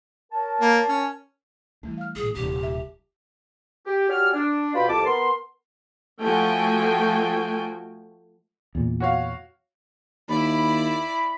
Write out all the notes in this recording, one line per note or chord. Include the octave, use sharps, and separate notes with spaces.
A#4 C#5 A5
A#3
C#4
E3 G3 A3 E4
F5 F6
A1 A#2 G#4
D#1 C3 G4
E5
G4
F#4 G4 C#5 D5 G#5 F6
D4
B2 F4 G4 B5
C2 F2 A5 D6
B3 A#4 C6
F3 A3 F#4 G5 G#5
E2 A#2
F#4 C#5 F5
D#2 E4 D5 B5